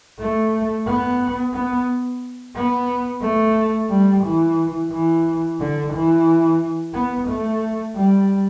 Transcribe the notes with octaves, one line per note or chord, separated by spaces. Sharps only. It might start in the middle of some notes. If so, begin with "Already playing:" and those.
A3
B3
B3
B3
A3
G3
E3
E3
D3
E3
B3
A3
G3